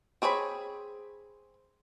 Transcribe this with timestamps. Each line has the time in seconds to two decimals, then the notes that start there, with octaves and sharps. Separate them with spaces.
0.22 C4 G#4 C#5 D#5 B5